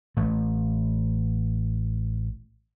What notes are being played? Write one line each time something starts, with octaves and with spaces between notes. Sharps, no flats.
A1 A3